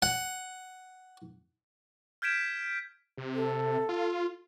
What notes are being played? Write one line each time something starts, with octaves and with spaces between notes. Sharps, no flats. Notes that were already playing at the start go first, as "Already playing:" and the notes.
F#5
F6 G6 G#6 B6 D7 E7
C3
A4
F4